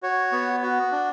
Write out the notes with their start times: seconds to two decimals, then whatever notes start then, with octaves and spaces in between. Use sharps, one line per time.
0.03 F#4 C#5
0.32 B3
0.63 F#4
0.92 D4